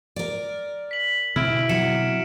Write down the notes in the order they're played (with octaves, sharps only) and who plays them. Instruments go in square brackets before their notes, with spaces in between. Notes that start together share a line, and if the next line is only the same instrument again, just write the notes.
[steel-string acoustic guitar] A#4 D5
[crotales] B6 F#7
[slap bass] B2 D3 C4 [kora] E4 [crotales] F6 D7
[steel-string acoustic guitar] F#3 [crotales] C#7 E7